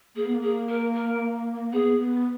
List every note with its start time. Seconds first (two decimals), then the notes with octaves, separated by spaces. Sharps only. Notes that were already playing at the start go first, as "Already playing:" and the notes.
0.15 A#3 G#4
0.26 B3
0.35 A#3
0.42 G#4
0.68 A#4
0.95 A#4
1.73 B3 G#4
1.98 B3